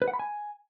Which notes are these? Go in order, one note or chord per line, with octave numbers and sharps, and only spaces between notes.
B4
F#5
B5
G#5